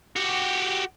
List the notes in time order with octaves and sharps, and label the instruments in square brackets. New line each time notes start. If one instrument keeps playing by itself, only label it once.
[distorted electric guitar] F#4 G4